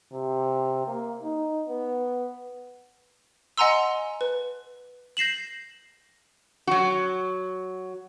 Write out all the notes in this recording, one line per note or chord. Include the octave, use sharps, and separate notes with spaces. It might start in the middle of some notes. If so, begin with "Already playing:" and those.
C3
A#3
D#4
B3
D#5 F#5 G#5 A#5 C6 E6
B4
G6 A#6 C7 E7 F#7
F#3 F#4